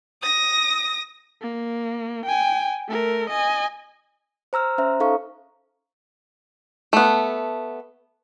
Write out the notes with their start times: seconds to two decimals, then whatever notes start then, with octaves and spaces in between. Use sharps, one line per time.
0.22 D#6 A#6
1.42 A#3
2.26 G5 G#5
2.89 A3 A#4
3.30 D#5 G#5
4.53 C5 A#5 E6 F6
4.78 C#4 C5 E5 A#5
5.00 D#4 A4 F5 C#6
6.93 A3 B3